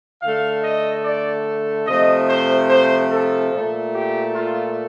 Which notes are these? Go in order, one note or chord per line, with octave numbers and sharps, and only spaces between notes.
D3 A3 F5
D#5
D5
C3 F3 A3 D#5
C5
C5
A4
A#2 A3
G4
F4